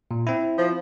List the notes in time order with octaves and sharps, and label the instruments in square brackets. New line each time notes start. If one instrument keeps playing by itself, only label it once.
[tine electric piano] A#2
C4 E4
[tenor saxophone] F3